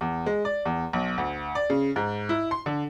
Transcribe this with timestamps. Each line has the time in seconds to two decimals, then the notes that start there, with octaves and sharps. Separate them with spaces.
0.01 E2
0.26 G#3
0.45 D5
0.65 E2
0.93 B1
1.18 D2
1.55 D5
1.70 C#3
1.96 G#2
2.29 E4
2.51 C6
2.66 D3